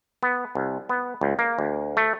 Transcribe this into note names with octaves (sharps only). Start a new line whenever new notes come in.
B3
C2
B3
C#2
A#3
D2
A3